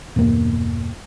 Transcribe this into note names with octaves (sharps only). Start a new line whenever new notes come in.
E2 G2 B2 A#3